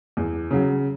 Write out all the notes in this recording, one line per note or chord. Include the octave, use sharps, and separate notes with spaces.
E2
C#3 F#3